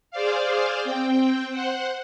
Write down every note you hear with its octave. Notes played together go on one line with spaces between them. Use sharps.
G#4 C5 D5 F5
C4 G5
C5 F#5